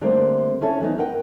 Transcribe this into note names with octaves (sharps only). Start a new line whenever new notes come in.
D3 G3 A3 A#3 C4
C#4 E4 A4 C#5
E3 F#3 B3 D#4
A#4 B4 F#5 G5